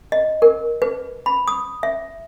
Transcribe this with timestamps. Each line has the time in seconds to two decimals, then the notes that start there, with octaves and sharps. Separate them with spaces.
0.12 D#5
0.42 A#4
0.82 B4
1.26 B5
1.48 D#6
1.83 E5